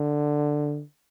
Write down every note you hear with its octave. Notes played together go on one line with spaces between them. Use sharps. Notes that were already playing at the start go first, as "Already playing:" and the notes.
Already playing: D3